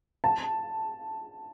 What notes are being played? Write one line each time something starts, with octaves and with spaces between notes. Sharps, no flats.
A5